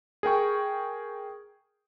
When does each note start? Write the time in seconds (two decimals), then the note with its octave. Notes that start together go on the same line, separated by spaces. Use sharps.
0.23 G#4 A#4 G5 C#6